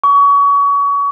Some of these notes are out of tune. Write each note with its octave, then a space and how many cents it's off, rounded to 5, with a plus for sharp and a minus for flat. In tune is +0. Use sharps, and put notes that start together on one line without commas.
C#6 +30